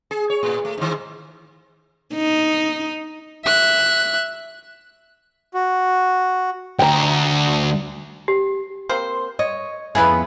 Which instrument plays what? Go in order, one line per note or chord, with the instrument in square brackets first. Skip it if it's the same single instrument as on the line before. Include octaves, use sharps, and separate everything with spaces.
[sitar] G#4
C#5
A2
A3
G#2 D#3
[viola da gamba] D#4
[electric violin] E5 F#6
[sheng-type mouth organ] F#4
[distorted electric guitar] D2 [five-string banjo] G5 A#5
[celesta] G4
[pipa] A#3 C4 C5
[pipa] C#5 [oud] D#5
[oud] F2 B3 G#4 [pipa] C#3 E4 B4